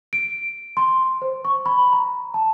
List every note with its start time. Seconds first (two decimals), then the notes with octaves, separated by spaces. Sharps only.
0.13 D7
0.77 C6
1.22 C5
1.45 C#6
1.66 B5
1.93 A#5
2.34 A5